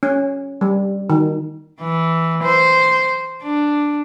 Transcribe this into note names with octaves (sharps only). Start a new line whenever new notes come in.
C#4
G3
D#3
E3
C5
D4